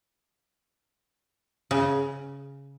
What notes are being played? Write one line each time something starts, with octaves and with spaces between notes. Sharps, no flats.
C#3